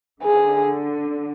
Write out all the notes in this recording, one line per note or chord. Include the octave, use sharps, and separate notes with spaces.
D3 G#4